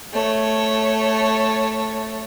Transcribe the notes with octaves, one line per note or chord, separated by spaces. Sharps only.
A3 C#5